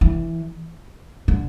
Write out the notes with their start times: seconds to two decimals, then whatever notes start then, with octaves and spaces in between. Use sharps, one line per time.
0.01 E3
1.28 D3